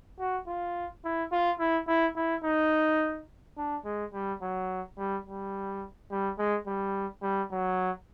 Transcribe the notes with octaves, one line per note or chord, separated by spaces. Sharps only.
F#4
F4
E4
F4
E4
E4
E4
D#4
D4
G#3
G3
F#3
G3
G3
G3
G#3
G3
G3
F#3